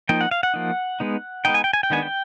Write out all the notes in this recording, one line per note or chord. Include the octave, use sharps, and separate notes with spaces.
F3 A#3 D#4 G5
F#5
F5
F#5
F3 A#3 D#4
G#3 B3 D#4
G#3 B3 D#4 G5
G#5
G5
G#5
G5
D#3 G#3 B3 D4 G#5
G5